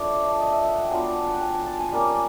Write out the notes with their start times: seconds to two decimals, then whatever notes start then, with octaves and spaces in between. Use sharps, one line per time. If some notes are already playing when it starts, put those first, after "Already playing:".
Already playing: A3 D4 F4 C#5
0.29 D5
0.40 D#5
0.52 E5
0.65 F#5
0.78 G5
0.90 F#3 B3 D4 F4 G#5
1.27 F#5
1.34 G5
1.41 G#5
1.54 A5
1.66 A5
1.79 G#5
1.92 G3 A#3 C#4